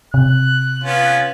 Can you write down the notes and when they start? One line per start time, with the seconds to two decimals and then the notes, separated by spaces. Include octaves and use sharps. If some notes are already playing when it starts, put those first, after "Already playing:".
0.14 C3 F#6
0.84 B3 C#4 F4